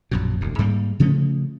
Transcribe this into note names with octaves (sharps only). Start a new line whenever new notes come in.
A#1 F#2 B2
E1 D2
G#2 G3 A3 A#3
C#3 F3 A3 C#4